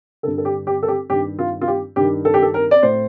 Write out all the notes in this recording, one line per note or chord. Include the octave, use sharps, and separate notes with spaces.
G2 D3 A4
A4
G4
G4
A4
G4
G2 D#3 G4
F4
F4
G4
G2 D#3 G4
A4
G4
A4
A#4
D5
A2 C5